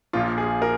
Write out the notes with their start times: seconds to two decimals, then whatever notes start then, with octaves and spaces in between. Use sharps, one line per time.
0.13 A#1 A#2 F3 F4
0.38 G#4
0.62 A#4